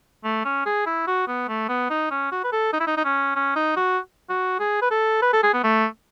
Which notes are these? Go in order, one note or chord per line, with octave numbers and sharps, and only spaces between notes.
A3
C#4
G#4
E4
F#4
B3
A3
B3
D#4
C#4
F#4
B4
A4
D#4
E4
D#4
D#4
C#4
C#4
D#4
F#4
F#4
G#4
B4
A4
B4
A4
G#4
B3
A3